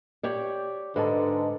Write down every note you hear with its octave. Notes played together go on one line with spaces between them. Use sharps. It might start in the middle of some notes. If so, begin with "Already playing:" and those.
G4 C#5 D5
G#2 D3 B4 D#5 A5